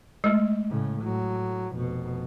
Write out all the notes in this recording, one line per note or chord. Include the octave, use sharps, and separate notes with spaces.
G#3 A3
A2 C#3
A2 F#3
F1 B2